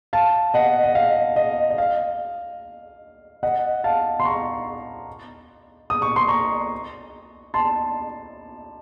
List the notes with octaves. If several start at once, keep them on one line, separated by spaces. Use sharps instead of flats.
F5 A5
D#5 F#5
D#5
F5
D#5
D#5
F5
D#5 F#5
F5 A5
C6
A#5 C#6
D#6
C#6
C6
A#5 C#6
A5 C6